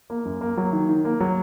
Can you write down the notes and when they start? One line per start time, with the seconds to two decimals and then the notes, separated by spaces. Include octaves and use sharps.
0.10 A#3
0.25 F#2
0.41 A#3
0.57 F#3
0.72 D#3
0.89 D#3
1.05 A#3
1.20 F#3